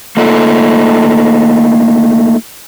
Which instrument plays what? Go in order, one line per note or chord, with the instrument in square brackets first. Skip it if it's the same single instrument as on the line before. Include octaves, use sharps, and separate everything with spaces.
[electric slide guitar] A3 A#3 D#4 F4 A4